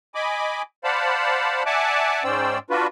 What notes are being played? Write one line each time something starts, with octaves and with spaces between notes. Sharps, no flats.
D#5 G#5 B5 D6
C5 D5 F5 F#5 A5 B5
D5 E5 F#5 G#5 A5 D6
G#2 C#4 C5 D5 G5 E6
D4 F4 F#4 B4